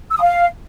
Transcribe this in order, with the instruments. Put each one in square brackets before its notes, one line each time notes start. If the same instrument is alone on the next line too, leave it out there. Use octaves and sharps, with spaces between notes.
[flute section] E6
D#6
F5